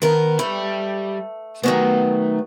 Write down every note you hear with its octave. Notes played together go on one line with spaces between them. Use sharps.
D#3 B3 A#4
G3 A3 B5
D#3 F#3 A3 B3 G#5